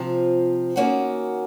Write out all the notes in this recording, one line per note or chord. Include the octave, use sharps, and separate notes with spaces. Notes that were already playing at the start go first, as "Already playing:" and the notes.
Already playing: C3 F3 C4 F4
D#3 A#3 C#4 F#4